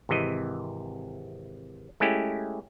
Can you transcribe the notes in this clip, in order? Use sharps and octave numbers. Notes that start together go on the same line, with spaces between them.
G#1 C3 E3 D#5
G#3 A3 C#4 E4 G4